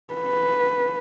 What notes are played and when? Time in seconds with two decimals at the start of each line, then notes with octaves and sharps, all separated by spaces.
0.14 B4